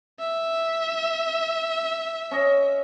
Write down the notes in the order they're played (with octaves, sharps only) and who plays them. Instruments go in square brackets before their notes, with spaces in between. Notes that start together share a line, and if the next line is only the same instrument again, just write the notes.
[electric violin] E5
[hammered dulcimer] C#4 D#5